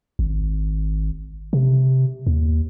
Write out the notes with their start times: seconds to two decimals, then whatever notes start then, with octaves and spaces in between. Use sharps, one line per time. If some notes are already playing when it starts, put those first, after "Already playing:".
0.19 G#1
1.53 C3
2.27 D#2